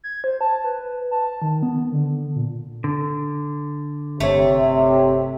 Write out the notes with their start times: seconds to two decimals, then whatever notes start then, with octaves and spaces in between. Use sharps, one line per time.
0.04 G#6
0.24 C5
0.41 A5
0.64 B4
1.11 A5
1.42 D#3
1.63 B3
1.92 D3
2.35 A#2
2.84 D3
4.20 G1 C3 A3 C#5